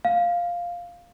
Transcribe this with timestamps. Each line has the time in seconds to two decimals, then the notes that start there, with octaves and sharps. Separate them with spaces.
0.05 F5